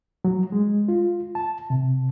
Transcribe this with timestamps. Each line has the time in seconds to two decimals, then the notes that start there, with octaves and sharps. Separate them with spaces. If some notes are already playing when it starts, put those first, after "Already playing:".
0.25 F#3
0.52 G#3
0.88 F4
1.35 A5
1.70 C3